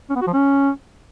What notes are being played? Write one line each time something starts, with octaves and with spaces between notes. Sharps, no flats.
C#4
B3
F#4
F3
C#4